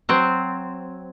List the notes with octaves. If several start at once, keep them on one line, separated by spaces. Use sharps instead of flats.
F#3 C4